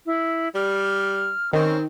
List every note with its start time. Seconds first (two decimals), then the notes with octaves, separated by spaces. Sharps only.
0.06 E4
0.55 G3 F6
1.53 D#3 C4 C#4